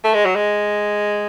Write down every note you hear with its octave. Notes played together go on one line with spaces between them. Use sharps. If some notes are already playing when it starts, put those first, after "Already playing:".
A3
G#3
F#3
G#3